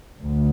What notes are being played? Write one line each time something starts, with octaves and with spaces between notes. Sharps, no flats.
D2